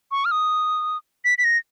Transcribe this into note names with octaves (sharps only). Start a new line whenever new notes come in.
C#6
F6
D#6
B6
B6
A#6